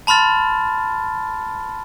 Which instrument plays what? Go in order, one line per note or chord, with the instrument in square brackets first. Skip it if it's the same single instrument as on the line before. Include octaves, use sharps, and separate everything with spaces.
[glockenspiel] A5 B5 C6 F6 A6